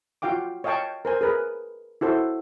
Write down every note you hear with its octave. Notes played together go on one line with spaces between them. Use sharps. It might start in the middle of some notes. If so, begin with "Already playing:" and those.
F4 F#4 F5 G5 D6
C#5 D#5 F5 G5 A5 C#6
A#4 C5 G#5
G#4 A#4 B4
E4 F#4 A4 C5